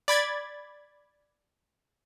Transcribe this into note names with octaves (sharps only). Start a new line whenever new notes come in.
D5 B5 G#6 A6